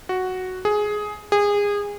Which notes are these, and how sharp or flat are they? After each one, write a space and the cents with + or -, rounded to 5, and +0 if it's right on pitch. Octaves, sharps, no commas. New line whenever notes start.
F#4 +0
G#4 +10
G#4 -25